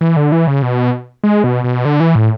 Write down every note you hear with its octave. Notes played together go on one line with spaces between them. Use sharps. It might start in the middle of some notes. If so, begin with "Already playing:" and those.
E3
D3
E3
C#3
B2
G#3
B2
B2
D3
E3
A2